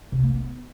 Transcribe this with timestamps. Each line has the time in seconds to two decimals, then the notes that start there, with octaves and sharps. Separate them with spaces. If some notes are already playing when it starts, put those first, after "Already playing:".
0.12 C3
0.23 A#3
0.34 B3